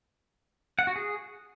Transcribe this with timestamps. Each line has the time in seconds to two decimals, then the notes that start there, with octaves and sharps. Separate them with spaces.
0.79 F#5
0.87 F#4
0.96 G#4